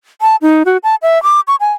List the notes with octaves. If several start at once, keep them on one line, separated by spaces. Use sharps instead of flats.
A5
D#4
F#4
A5
E5
D6
C#6
G#5